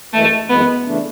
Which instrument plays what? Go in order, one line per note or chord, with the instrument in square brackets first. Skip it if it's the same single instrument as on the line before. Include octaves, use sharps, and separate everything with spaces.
[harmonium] F#2 E3 G#3 [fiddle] A3
[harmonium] F#2 E3 G#3 [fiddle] B3
[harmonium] C#3 E3 A3 D4